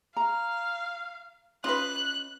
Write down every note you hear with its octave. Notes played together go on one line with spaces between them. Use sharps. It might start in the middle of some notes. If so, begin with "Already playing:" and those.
F5 A#5
C#4 F4 B4 D#5 B5 F#6